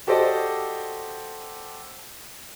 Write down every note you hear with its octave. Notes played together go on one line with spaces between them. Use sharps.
F#4 G4 A4 C5 D5 D#5